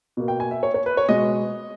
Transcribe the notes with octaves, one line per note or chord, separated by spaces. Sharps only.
B2 A#3
G5
G#5
E5
C#5
C#5
B4
C#5
B2 G#3 D#5